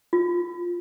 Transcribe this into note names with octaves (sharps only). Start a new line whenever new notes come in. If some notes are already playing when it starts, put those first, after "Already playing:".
F4